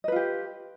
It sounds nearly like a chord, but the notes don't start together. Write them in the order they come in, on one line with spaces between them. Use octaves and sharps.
D#5 B4 F4 G4